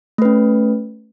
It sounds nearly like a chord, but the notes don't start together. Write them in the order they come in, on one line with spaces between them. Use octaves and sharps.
A3 B4 C#4